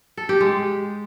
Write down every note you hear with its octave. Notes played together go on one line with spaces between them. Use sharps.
A4
G4
G#3